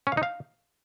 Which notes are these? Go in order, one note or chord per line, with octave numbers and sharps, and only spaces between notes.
C#4
F5
D#4
F5